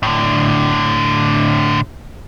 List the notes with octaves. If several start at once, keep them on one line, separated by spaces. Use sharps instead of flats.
A2 D3